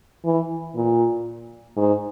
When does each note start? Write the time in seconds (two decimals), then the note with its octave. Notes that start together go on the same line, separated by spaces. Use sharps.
0.25 E3
0.75 A#2
1.77 G#2